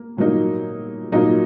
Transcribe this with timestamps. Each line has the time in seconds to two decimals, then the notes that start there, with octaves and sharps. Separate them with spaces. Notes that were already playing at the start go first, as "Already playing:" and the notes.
Already playing: A#3
0.17 A#2 F#3 A#3 D#4
1.12 A#2 F#3 A#3 D#4